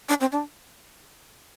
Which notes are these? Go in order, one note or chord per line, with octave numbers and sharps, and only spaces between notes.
D4
C4
D4